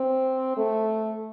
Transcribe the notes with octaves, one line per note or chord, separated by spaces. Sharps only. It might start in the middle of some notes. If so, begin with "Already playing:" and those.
Already playing: C4
A3